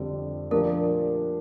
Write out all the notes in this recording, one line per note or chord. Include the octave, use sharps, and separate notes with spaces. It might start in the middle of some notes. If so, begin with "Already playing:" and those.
Already playing: F2 D3 G3
A#2 F3 A3 D4 G4 A#4